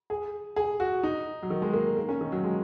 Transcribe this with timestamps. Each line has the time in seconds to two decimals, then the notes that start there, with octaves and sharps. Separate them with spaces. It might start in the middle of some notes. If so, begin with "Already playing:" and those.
0.10 G#4
0.56 G#4
0.80 F#4
1.03 D#4
1.43 F#3
1.50 D#3
1.62 G#3
1.74 A#3
1.97 A#3
2.09 C#4
2.21 D#3
2.32 F#3
2.43 G#3